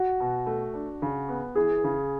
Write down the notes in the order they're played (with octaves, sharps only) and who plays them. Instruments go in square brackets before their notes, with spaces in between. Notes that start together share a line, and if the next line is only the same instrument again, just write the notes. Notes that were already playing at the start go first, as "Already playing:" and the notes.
Already playing: [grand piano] F#4
[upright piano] B2
A3
D4
C#3
B3
[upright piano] E3 [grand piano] G#4
[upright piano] C#3